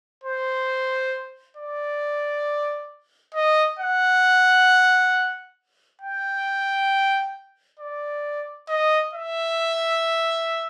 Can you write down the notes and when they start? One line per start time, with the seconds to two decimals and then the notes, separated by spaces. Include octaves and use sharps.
0.24 C5
1.57 D5
3.35 D#5
3.79 F#5
6.01 G5
7.80 D5
8.69 D#5
9.13 E5